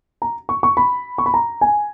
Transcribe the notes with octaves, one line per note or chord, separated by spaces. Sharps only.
A#5
C#6
C#6
B5
C#6
B5
A#5
G#5